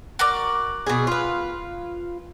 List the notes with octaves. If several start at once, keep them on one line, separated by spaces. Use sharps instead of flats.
F#4 A#4 D5
B2 G#4
F4 B4